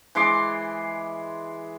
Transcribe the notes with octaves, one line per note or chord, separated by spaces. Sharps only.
E3 G#3 C6 D6